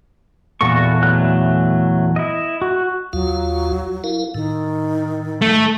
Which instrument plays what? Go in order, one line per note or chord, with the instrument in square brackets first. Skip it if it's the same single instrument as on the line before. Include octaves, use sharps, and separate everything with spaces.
[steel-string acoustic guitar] E2 A#2 E3 [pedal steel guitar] F#4 A4 C#6
[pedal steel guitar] F#3 A3 F#6
E4 D#5
F#4
[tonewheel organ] D#2 F4 F5 [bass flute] F#3
[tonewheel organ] E4 A#4 F5
[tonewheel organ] A2 [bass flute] D#3
[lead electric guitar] A3